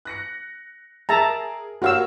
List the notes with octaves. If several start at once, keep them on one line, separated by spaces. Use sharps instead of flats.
F#6 A#6 C#7
G#4 A#4 E5 A5 A#5
A#3 F#4 G4 C#5 F5 E6